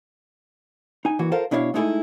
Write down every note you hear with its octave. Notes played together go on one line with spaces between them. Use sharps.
D#4 G#5
A#2 E3 F#4
F4 A4 A#4 C5 F5
B2 D4 E4 C#5 D5 F5
G#3 A3 D#4 E4 G#4 A4